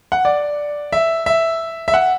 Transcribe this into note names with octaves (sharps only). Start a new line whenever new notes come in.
F#5
D5
E5
E5
E5
F#5